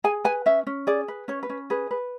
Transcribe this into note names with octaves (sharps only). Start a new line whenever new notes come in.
G#4 G#5
B4 G#5
C#4 E5
C#4
G#4 D5
B4
C#4 C#5
B4
C#4
G#4 B4
B4